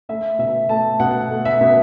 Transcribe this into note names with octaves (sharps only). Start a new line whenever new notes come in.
A3 E5
B2 E5
A3 A5
B2 F#5
A3
E5
B2